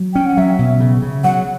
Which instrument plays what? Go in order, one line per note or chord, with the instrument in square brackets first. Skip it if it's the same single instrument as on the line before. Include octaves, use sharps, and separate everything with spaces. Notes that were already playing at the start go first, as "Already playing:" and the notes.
Already playing: [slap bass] F#3
[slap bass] C#4 [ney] G5
[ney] F#5
[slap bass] F#3 [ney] E5
[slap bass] B2
C#3
C#3
[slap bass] F#3 [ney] F#5